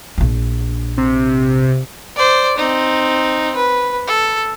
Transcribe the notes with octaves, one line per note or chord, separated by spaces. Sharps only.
A#1 D4
C3
C5 D5
C4 D#4
B4
A4